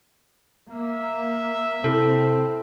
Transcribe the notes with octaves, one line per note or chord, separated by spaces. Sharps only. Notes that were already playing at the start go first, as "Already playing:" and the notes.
A#3 E5
C3 C4 E4 A4